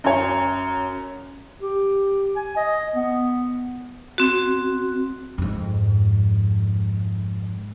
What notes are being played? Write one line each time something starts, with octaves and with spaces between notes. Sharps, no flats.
F#2 C#5
G4
G#5
D#5
B3
C4 F#4
F2 G#2